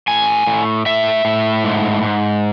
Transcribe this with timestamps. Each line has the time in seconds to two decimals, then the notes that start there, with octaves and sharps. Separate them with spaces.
0.08 A2 G#5
0.47 A2
0.86 A2 E5
1.25 A2
1.64 G#2
2.03 G#2